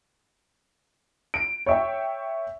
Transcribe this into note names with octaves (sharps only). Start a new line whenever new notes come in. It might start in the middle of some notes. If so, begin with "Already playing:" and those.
D7
C#5 E5 G5